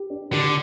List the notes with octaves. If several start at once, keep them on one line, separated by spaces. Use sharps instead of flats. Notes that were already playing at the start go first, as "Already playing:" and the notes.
Already playing: G4
D4
D3 G4